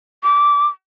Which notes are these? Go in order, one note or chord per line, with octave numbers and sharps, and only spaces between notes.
D6